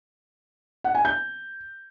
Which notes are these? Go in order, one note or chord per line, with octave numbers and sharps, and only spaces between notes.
F#5
G#5
G6